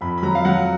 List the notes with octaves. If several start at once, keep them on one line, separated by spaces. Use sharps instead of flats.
F2 B5
B5
F#3 A#5
F5
F#3 F#5